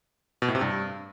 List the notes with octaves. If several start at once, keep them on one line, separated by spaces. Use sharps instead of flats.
B2
A2
C3
G2